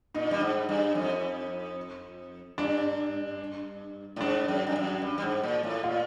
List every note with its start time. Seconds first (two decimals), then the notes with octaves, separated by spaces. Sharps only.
0.14 A#2 D#4
0.31 G2
0.41 G#2
0.69 G2
0.95 F2
2.58 G2 D4
4.16 A2
4.21 G#2 D4
4.48 F#2
4.67 G2
4.76 F#2
5.02 G2
5.18 G2
5.22 G#2
5.43 A#2
5.63 A2
5.83 A#2 F4